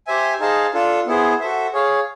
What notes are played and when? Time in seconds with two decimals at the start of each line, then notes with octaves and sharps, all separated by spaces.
0.07 G4 C5 E5 G#5
0.40 D#4 G#4 C5 F5 A5
0.74 D4 F4 A4
1.07 B3 E4 G#4 C5
1.40 F#4 A4 C5 E5
1.73 G#4 C#5 F5